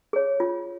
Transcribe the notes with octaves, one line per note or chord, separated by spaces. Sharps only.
G#4 C#5
F4